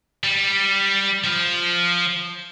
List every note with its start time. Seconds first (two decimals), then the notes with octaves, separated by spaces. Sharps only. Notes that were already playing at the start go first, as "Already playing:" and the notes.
0.24 G3
1.24 F3